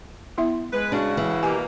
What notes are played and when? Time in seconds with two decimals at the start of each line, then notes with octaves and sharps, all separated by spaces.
0.38 B3 E4 E5
0.73 G#3 B4
0.92 C#3 D4 F#4
1.17 E3
1.43 B2 A#3 G4 G#5